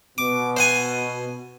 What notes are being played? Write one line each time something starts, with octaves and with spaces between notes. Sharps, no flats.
B2 D6
C5 F#5 G#5